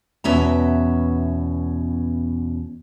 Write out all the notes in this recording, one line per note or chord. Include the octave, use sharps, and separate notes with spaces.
E2 B2 C#4 E5 A#5